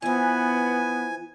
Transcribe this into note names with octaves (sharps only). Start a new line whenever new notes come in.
E3 F3 B3 G#5